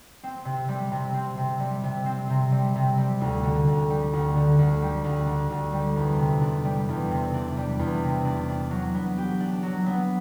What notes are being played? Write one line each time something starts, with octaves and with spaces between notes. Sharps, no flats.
C4
C3
G3
C3
C4
C3
G3
C3
C4
C3
G3
C3
G3
D2
D3
D2
G3
D2
D3
D2
G3
D2
D3
D2
G3
E2
C3
D4
G3
E2
C3
D4
G3
E2
C3
D4
D4
F#3
B3
G4
D4
F#3
B3